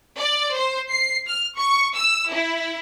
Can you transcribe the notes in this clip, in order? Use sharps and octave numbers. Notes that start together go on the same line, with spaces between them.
D5
C5
C7
F6
C#6
E6
E4